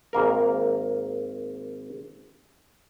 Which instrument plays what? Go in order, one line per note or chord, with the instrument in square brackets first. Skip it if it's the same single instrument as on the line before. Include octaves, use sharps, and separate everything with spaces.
[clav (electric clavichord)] G#1 A#3 A#4